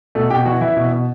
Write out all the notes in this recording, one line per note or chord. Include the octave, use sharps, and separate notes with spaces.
B2 A3 A4
B2 G4 G5
E3 F#4 F#5
E3 E4 E5
B2
B2